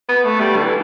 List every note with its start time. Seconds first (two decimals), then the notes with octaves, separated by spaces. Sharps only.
0.09 B3
0.25 A3
0.41 G3
0.55 D3
0.64 E3